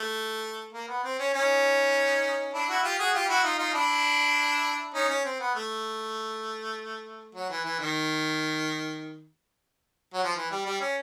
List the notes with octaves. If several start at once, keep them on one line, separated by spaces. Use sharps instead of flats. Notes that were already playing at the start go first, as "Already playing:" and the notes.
Already playing: A3
A#3
B3
C4
C#4
C#4 D#4
D4 E4
E4 F#4
F4 G4
F#4 G#4
F4 G4
E4 F#4
D#4 F4
D#4 F4
D4 E4
C#4 D#4
C#4
C4
B3
A3
F#3
E3
E3
D#3
F#3
F3
E3
G3
G3
C#4